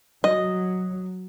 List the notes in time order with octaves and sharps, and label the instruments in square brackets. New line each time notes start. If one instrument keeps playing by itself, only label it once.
[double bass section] F#3 [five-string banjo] D#5